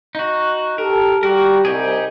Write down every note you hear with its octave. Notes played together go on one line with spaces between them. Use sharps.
D#4 F#4
G4 A4 A#4
G3 F#4 G4 A#4
C2 D#4 G4 G#4